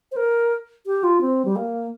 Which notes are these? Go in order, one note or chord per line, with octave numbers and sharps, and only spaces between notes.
C5
A#4
G4
F4
C4
G3
A#3